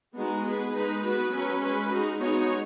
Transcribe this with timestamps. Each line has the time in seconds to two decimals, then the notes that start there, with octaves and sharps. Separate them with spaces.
0.15 G#3 B3 D#4 F#4
0.45 B3 G#4 B4
0.73 G#3 D#4 B4
1.03 B3 F#4 B4
1.32 F#3 C#4 B4
1.61 G#3 C#4 B4
1.90 G#3 D#4 F#4
2.19 G#3 B3 D#4 F#4 C#5